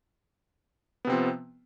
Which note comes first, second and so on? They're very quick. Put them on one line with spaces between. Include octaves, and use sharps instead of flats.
B3 C3 C4 F3